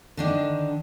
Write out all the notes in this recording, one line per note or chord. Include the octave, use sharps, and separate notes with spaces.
D3 D#3 D4